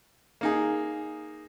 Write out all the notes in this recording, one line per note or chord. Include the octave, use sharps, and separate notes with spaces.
A#3 D#4 G#4